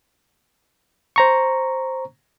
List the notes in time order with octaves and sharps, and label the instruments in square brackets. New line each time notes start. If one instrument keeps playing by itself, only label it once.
[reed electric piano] C5 A#5 C#6